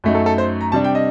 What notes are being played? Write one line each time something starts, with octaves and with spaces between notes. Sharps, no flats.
F#2 F#3 A3 D#4
A4
A4
C5
A#5
C3 G3 D4 A5
G5
D#5